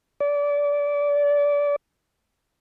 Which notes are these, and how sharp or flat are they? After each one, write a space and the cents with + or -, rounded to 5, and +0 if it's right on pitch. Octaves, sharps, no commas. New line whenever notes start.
D5 -25